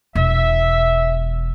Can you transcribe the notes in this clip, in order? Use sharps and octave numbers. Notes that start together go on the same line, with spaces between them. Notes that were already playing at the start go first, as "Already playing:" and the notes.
E1 E5